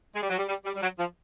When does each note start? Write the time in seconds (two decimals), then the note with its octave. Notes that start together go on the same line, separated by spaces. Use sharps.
0.14 G#3
0.23 G3
0.30 F#3
0.38 G3
0.48 G3
0.64 G3
0.75 G3
0.82 F#3
0.99 F3